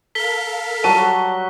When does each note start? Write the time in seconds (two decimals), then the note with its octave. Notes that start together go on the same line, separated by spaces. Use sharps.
0.15 A4 A#4 F5 B6 G7
0.84 F#3 G3 F#4 A5 D#7